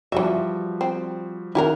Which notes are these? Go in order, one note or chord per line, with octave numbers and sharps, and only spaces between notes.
E3 F3 G3 F#4 E5
C4
D#3 E4 G4 A#4 F#5